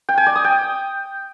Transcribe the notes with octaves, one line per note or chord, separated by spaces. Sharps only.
G5
G#5
D5
D#6
G5